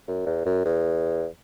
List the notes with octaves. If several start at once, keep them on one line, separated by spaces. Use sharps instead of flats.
F#2
E2
F#2
E2